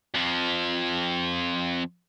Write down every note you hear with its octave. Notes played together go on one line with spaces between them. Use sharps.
F2 F3